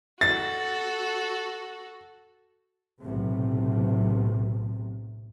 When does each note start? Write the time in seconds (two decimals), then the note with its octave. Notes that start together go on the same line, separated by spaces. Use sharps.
0.21 F#4 A4 A6
3.01 B1 A2 C3